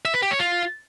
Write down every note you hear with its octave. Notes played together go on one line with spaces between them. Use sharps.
E5
B4
G4
C#5
F4